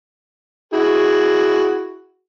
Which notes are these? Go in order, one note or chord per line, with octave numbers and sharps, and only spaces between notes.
E4 F#4 G#4